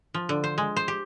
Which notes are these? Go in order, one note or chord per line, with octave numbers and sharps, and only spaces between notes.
F3
D3
C5
G#3
C5
G4